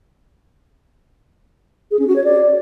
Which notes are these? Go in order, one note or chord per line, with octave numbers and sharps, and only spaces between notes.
G#4
C#4
F#4
C#5
D5